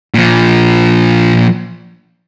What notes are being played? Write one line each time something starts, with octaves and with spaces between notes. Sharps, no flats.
A#2 F3